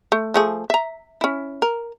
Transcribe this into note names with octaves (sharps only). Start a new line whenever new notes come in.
A3
F3 A3 G#4
E5 A#5
C#4 E4
A#4